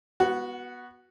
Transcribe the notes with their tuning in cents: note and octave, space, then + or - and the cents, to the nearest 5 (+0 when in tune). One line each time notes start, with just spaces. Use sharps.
B3 -15 F#4 +0 F#5 -40